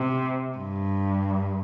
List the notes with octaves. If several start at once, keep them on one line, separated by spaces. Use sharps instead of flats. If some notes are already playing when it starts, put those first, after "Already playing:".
Already playing: C3
G2